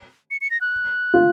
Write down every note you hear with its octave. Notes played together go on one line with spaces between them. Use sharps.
C#7
C#7
A#6
F#6
F4